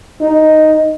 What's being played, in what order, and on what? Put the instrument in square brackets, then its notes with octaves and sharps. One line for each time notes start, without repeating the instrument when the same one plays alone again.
[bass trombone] D#4